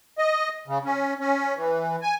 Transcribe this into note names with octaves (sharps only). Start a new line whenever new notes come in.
D#5
C#3
C#4
C#4
E3
G#5